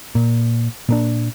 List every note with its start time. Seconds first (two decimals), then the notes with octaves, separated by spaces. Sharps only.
0.15 A#2
0.89 A#2 A#3 D4